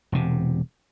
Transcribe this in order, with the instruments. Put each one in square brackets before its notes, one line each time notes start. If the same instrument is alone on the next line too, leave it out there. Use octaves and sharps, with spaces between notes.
[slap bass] E1 C3